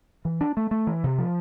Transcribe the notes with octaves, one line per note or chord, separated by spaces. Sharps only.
E3
D4
A3
A3
E3
C3
F3